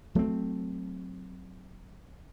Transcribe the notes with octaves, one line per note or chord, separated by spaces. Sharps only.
F#3 A3 B3 C4